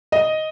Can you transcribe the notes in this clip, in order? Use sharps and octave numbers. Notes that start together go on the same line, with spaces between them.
D#5